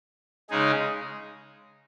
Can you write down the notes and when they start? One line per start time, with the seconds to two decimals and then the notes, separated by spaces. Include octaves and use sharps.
0.50 C#3 G#3 D#4 G#4